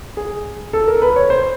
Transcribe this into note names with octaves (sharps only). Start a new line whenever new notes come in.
G#4
A4
A#4
B4
C#5
C5